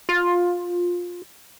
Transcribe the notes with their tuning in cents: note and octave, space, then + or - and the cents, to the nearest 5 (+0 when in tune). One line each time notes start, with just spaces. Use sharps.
F4 +15